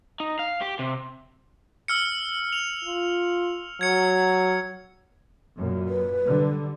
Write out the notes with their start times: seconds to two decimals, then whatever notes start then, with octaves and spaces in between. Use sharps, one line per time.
0.20 D#4
0.39 F5
0.61 G4
0.79 C3
1.88 E6 F6 C#7
2.53 F7
2.85 F4
3.81 F#3 G#6 C#7
5.57 F#2 A#2
5.88 B4
6.24 D3 G3